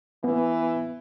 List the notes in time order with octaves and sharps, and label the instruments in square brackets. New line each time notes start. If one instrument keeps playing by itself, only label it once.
[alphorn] E3 [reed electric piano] B3